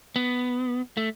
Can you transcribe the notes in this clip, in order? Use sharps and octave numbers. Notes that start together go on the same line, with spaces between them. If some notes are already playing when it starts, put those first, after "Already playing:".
B3
A3